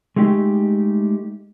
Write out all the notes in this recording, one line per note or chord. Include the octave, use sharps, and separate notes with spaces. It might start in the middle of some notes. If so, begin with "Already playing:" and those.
G#3 A3 D#4 G4